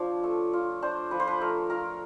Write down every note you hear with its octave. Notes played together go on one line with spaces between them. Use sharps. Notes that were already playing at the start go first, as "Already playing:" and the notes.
Already playing: F3 D4 F4 C#5
A3
F4
D4 C5
F3 B4
C5
B4
A3 A#4
F4 A#4